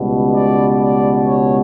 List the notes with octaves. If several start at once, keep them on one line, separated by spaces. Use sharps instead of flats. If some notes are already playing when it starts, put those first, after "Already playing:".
Already playing: C#2 B2 G3
D5
D5
C#5